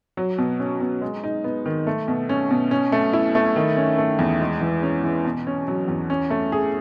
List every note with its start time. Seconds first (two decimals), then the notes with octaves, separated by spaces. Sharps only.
0.17 F#3
0.38 B2
0.60 C#4
0.81 B2
1.01 G#3
1.24 D#4
1.44 B3
1.66 D#3
1.87 A3
2.08 B2
2.29 C#4
2.51 B2
2.71 C#4
2.92 A3
3.13 E4
3.35 A3
3.56 D#3
3.77 C#4
3.98 A3
4.19 E2
4.41 G#3
4.61 E3
4.83 C#4
5.04 E3
5.25 B2
5.47 C#4
5.68 F#3
5.88 E2
6.10 C#4
6.30 A3
6.52 G#4